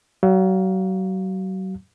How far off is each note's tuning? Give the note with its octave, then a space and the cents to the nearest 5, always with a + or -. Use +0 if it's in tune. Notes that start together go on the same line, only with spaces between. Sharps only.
F#3 +35 F5 +0